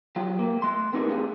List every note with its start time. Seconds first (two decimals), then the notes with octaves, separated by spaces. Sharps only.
0.16 F#3 F4 G4
0.39 A3 A#3
0.62 A3 C6
0.93 B3 C4 D#4 G4 A#4
1.08 A3 C#4 G4 G#4 F5